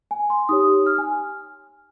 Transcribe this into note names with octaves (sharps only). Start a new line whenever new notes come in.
G#5
C6
D#4 G4 C#5 D#6
F6
G#5